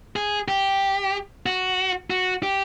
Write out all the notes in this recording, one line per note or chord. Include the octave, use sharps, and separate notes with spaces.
G#4
G4
F#4
F#4
G4